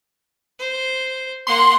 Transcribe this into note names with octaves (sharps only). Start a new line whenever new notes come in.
C5
A#3 F#5 C6